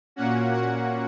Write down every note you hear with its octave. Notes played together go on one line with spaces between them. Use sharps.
A#2 A#3 C#4 F#4 F#5
F#4 F#5